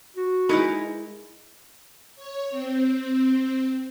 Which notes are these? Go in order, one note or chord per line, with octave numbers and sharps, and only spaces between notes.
F#4
G#3 D#4 E4 A#4 B4
C#5
C4